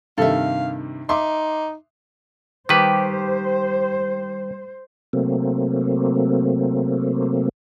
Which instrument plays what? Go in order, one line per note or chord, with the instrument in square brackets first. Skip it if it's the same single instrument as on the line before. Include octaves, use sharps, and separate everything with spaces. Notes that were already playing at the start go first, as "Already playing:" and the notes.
[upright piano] G2 C3 D#3 [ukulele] A4 E5 [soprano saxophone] F5
[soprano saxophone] D#4 [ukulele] E5 [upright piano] C6 D6
[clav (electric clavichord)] D#3 B4 [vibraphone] G3 [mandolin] G4 [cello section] C5
[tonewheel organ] C3 F#3 A3 A#3 C4